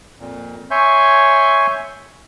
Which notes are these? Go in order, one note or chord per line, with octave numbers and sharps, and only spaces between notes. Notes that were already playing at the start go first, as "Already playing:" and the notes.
F2 A#2
C#5 E5 G#5 C6 C#6 G6